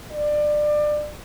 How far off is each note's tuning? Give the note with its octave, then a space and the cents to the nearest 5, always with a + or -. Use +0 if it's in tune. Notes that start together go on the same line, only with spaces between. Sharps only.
D5 +25